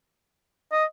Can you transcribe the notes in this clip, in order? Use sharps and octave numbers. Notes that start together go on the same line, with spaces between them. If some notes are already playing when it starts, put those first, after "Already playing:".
D#5